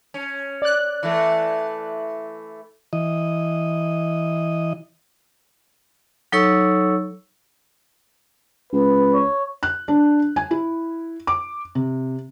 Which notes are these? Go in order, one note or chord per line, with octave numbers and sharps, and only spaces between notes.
C#4
D5 F#6
E3 A3
E3 D#5
F#3 D#4 A4 C#5 C#6 E6
C#2 B4
C#5
F#6
D4
G#5
E4
D6
C3